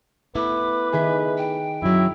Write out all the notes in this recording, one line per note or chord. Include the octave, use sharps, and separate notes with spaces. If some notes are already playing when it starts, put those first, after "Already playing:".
A3 B3 E4 B4 D6
D#3 G#4 E5
G5
F#2 F#3 E4